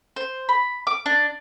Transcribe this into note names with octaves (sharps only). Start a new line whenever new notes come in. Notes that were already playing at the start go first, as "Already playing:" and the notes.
C5
B5
D6
D4